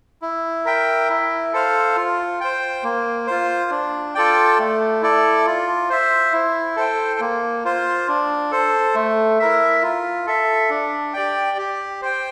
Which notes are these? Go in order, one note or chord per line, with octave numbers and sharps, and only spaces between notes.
E4
A#4 E5 G5
E4
A4 C5 F5
F4
C5 G5
A#3
F4 C5
D4
F4 A4 D5 G5
A3
E4 A4 D5
F4
C5 E5
E4
A4 C5 G5
A#3
F4 C5
D4
A4 C5
A3
E4 A#4 E5
F4
A4 E5
D4
G4 D5 G5
G4
C5 G5